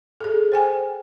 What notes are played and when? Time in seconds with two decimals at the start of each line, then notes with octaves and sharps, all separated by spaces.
0.20 G#4 A4
0.52 C5 G5 G#5